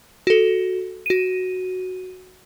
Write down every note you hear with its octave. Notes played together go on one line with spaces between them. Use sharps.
F#4 A4
F#4 D#7